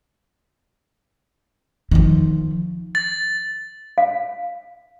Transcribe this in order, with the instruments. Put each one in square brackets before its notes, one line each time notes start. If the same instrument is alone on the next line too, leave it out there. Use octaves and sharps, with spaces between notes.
[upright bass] D#3 F3
[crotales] A6
[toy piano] F5